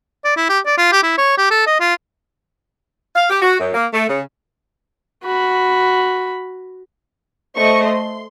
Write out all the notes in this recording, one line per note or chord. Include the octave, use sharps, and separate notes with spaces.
D5
E4
G4
D5
F4
G4
E4
C#5
G4
A4
D#5
F4
F5
G4
F#4
F#2
A#3
A3
C#3
F#4 B5
A3 C5 D#5 C#6
C6